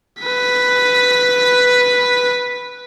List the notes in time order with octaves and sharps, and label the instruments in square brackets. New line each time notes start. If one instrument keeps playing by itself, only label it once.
[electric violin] B4 B6